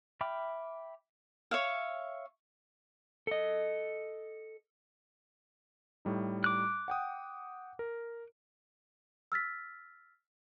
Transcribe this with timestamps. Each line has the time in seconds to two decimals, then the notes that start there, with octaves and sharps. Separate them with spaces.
0.21 E5 G5 B5 D6 F6
1.51 C#5 E5 F5
3.27 A4 D#5
6.05 A2 G3 D#4
6.44 D6 F#6
6.88 F#5 G5 D#6
7.79 A#4
9.32 E6 F6 A6 B6